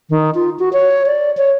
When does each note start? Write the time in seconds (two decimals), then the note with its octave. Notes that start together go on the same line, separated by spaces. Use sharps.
0.10 D#3
0.35 F4
0.59 F#4
0.73 C#5
1.06 D5
1.37 C#5